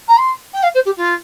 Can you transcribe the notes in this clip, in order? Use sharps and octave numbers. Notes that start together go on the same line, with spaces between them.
A#5
C6
G5
F5
C5
G4
F4